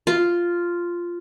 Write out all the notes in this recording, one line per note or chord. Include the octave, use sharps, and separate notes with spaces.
F4